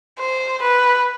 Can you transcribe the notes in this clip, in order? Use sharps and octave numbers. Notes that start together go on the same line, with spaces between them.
C5
B4